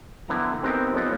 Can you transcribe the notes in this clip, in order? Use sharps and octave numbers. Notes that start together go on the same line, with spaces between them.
D3 B3 E4 G5 A#5
B3 C4 D#4 G4 A#4
B3 D#4 F4 A4 C#5